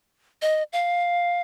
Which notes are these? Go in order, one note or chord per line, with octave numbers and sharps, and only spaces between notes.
D#5
F5